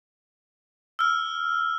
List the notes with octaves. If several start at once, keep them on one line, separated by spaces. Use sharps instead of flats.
E6 F6